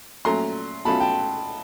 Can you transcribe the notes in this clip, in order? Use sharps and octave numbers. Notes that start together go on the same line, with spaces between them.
A#2 F#3 A3 C#4 A#5 C6
B2 F#3 A3 C#4 F4 A5 B5
G5 A5